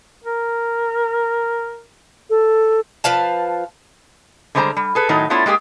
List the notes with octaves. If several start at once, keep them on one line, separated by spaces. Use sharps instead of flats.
A#4
A4
F3 B4 F5 A5
D3 G3 G#3 C5 G#5 A#5
G3
G#4 A4 B4
A2 D#3 F#3 D#4
A3 B3 D4 E4 F4 C#5
G#3 A#3 G4 G#4